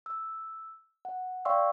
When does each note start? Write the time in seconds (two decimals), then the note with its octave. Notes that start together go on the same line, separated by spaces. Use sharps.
0.06 E6
1.05 F#5
1.45 D5 F5 G5 C6 C#6 E6